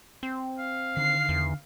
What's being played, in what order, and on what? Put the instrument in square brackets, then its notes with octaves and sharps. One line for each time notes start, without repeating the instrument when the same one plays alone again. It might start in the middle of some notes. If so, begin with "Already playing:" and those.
[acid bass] C4
[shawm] F5
[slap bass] D3 D#3 [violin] C7
[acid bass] E2